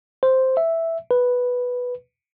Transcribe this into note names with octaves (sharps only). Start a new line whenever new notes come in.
C5
E5
B4